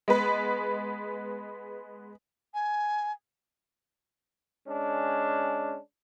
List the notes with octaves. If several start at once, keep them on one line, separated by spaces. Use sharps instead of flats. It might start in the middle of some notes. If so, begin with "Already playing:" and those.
G#3 B3 B4
G#5
G#3 C#4 D4